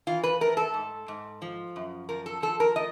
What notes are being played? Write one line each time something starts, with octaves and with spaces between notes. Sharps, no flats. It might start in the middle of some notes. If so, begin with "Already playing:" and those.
E3 F4
B4
A3 A#4
A4
G#2
G#2
F3
F#2
F3 A#4
A4
F3 A4
A#4
A3 D#5